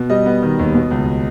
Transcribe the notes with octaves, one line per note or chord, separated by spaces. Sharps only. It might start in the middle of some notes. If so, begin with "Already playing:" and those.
Already playing: B2
G3 D#5
B3
D#3
D#2
B2
C#2